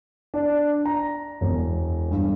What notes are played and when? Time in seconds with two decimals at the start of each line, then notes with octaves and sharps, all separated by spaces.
0.34 D4
0.85 A#5
1.41 E1
2.11 G2